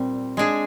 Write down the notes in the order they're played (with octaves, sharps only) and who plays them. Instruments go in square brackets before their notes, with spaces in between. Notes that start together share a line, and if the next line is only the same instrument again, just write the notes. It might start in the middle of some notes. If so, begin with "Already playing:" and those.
Already playing: [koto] A#2 G3 [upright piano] C4
[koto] G#3 D4 G#4